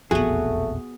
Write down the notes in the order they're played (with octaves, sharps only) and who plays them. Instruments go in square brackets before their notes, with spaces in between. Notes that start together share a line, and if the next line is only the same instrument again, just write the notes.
[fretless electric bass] E1 A#1 F2 [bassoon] A3 [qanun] B3 F#4 [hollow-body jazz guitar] G#4